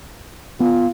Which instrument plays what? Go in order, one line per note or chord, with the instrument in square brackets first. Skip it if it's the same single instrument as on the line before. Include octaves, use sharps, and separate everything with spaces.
[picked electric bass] B3 [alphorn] F4